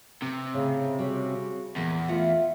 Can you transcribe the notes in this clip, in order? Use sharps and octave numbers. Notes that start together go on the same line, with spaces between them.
C3 C4 B4
A2 C#3
C#3 G3 F#4
E2 A#2 E3 G#3
A3 F4 E5 F#5